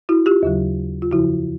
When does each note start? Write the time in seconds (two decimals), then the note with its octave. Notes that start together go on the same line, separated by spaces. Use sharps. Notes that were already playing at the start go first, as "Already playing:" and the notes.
0.09 E4 F#4
0.26 F4 G4
0.43 D#2 C#3 F#3
1.02 F4
1.11 F2 C#3 F3 E4 F#4